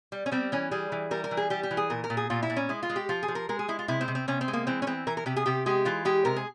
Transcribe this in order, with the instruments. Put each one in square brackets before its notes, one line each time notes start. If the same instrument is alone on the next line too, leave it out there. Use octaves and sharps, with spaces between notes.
[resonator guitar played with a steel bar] G3
C#4
G3 C4
E3 C#4
G3 G#4
E3
G3 A#4
A#4
E3
G#4
G3 G4
G4
E3
G#4
A#2 A#4
A#4
A#2
G#4
A#2 F4
E4
A#2
C#4
G#3 E4
F4
G#3
G4
F3 F4
G#4
F3
A#4
G#3 A#4
G#4
G#3 E4
F4
C3 E4
C4
C3
C4
C3 C#4
C4
G#3
A#3
E3 C4
C#4
E3 C4
E3 A#4
A#4
C3 G4
G#4
C3 G4
G#3 G4
E3 F4
G#3 G4
C3 A#4
G#4